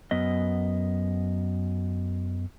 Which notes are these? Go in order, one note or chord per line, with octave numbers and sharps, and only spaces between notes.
F#2 B3 D#5